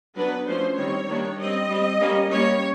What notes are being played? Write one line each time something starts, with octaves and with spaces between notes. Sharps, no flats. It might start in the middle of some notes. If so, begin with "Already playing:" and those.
F#3 B3 D4 B4
F3 A3 C#4 C5
D#3 G3 C4 C#5
D#3 G3 A#3 D4
G3 C4 D#5
G3 C4
G3 A#3 C#4
G3 A#3 C#4 C#5